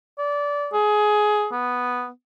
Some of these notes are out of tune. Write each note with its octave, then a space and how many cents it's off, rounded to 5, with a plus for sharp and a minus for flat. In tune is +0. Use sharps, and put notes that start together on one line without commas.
D5 -20
G#4 +15
B3 +0